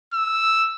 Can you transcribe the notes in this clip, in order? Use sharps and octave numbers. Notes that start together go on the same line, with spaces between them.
E6